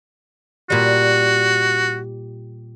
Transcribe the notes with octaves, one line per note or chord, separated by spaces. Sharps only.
A#2 G3 F#4